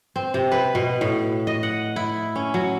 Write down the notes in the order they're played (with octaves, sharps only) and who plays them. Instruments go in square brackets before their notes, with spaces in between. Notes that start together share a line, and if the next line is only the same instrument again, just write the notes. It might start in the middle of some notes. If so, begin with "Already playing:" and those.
[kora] C4
C3
B4
B2
A2
D#5
F#5
E4
C#4
F#3